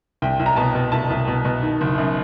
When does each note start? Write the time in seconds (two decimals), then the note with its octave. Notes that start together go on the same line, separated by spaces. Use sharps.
0.22 C2 G5
0.40 C2
0.46 A#5
0.56 B2 A5
0.75 B2
0.92 C2 A5
1.10 C2
1.28 B2
1.45 B2
1.63 D#3
1.81 F#1
1.98 F#2